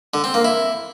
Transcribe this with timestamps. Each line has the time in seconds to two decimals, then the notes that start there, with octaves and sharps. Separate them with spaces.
0.14 D3
0.24 C4
0.34 A#3
0.45 E4